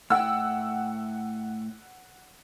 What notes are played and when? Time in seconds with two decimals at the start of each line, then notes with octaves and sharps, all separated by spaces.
0.10 A2 F#5 G5 E6